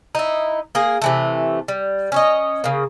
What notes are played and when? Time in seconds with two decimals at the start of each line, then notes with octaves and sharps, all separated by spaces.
0.15 D#4 E4
0.75 A#3 G#4
1.02 C3 E3 A3
1.68 G3
2.12 C#4 C#5 D#5
2.64 C#3 A#3